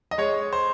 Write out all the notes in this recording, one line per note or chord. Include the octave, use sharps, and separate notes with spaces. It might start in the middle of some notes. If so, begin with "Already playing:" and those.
D#5
G#3 C#5
C5